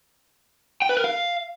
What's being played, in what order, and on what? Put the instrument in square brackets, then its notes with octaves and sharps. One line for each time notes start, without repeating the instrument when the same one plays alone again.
[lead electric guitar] G5
B4
A#4
F5